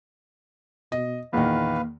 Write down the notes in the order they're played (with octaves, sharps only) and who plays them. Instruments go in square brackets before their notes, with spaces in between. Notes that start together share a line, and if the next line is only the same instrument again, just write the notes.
[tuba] B2 [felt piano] D#5
[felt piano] E2 A#2 D#3 [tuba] A#3 [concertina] B4 F5